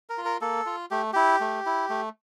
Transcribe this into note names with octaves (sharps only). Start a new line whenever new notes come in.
A#4
F4
A#4
A#3 A4
F4
A3 G4
E4 G4
A3
E4
A3